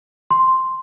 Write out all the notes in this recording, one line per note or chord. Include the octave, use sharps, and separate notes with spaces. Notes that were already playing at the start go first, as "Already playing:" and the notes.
C6